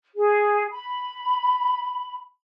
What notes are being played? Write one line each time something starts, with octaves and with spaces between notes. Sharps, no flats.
G#4
B5